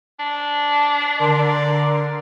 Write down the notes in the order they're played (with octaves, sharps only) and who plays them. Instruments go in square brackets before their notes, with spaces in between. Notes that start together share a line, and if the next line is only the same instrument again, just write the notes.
[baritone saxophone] D4
[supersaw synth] D3 A#4 C6 [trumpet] D5